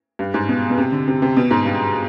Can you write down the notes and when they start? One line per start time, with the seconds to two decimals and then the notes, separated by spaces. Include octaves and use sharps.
0.19 G2
0.34 G#2
0.49 B2
0.70 B2
0.78 C3
0.92 D3
1.08 C3
1.22 C3
1.37 B2
1.51 G#2
1.65 G2